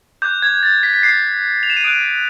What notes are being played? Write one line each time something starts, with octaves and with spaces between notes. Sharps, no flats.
D6 F#6 G6
G#6
A6
B6
B6
D6 F#6 C7
F7
E7
D#7
D#6 F#6 D7